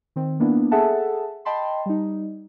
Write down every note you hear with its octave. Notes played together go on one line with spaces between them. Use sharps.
D#3 C4
A#3 B3 D4 E4
G#4 A4 E5 F#5 A5
D#5 G5 A5 B5 C6
G3 D#4